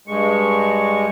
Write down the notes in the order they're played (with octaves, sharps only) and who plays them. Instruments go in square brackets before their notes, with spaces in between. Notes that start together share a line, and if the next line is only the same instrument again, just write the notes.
[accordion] G2 G#3 C#6